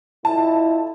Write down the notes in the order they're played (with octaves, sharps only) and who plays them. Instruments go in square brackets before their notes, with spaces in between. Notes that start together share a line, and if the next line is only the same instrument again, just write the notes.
[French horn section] F2 E4 [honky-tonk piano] A5